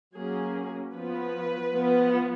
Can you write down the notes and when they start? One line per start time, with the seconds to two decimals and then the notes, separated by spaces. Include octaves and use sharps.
0.17 F#3 A#3 C#4 G#4
0.95 F3 B3 B4
1.73 F3 B3